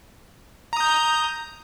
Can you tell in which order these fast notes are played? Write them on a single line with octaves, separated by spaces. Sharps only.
A#5 D#6 G6